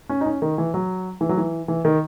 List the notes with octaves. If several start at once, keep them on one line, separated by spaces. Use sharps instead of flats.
C#4
D#4
C#4
D#3
E3
F#3
E3
F#3
E3
E3
D#3